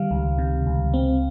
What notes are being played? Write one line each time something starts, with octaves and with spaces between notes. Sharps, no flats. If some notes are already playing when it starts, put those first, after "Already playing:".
Already playing: D#3 G3 F5
C#2
C3
C#2
C4